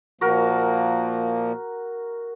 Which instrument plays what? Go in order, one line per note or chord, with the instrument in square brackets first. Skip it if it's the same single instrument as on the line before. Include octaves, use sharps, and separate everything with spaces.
[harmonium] A#2 F3 A#3 [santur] F#4 A#4